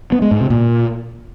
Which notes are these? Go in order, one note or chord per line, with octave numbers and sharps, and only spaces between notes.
B3
G#3
G#2
C3
A#2